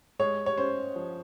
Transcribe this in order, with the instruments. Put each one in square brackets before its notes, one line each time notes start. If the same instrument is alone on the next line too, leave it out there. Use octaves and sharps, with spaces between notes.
[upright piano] G#3 C#5
C#5
C#4 C5
F3